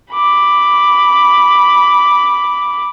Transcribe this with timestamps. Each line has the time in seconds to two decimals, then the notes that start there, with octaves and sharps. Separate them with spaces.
0.13 B5 D6